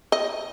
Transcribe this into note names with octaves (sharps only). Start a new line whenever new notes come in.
D#5